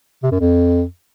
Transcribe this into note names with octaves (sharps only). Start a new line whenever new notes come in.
C3
F#2
F2